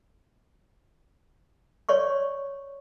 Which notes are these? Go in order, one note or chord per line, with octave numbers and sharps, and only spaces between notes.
C#5 D5 C6 C#6